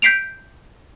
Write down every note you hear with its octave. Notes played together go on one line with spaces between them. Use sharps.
G6 B6 C7 D7 F7